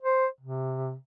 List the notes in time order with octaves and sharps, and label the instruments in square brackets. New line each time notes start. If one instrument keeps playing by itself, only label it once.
[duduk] C5
C3